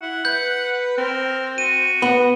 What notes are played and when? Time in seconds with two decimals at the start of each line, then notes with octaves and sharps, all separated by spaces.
0.02 E4 F#5
0.25 B4 G6
0.98 C4 A#4
1.58 F#4 D#7
2.02 B3